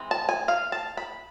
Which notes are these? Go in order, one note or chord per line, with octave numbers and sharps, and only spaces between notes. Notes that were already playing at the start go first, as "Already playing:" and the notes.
Already playing: E3 G#3 C4
A5
G#5
F5
A5
B5